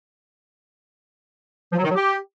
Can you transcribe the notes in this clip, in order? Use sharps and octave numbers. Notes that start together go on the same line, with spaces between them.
F3
F#3
D#3
F#3
G4